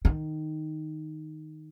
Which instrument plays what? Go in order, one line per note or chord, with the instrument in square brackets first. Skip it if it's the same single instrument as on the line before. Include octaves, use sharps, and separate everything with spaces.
[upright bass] D#3